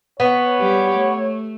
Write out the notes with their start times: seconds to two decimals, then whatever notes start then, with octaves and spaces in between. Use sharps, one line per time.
0.20 B3 C#5
0.59 G3 G4
0.97 A3